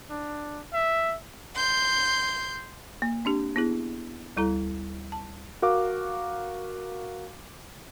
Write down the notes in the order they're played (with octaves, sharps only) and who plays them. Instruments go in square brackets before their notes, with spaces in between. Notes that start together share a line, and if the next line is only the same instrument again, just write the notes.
[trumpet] D4
E5
[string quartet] C6 G6
[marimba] A#3
C4 D4 G4
B3 E4 G#4
D2 G3 E4 A4 A#5
A5
[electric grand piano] F#4 A#4 F5 D6